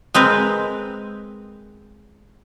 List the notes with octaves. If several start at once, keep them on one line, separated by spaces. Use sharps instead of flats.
G#3 C4 A#4 B4